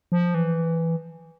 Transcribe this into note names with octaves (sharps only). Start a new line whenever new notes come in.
F3
E3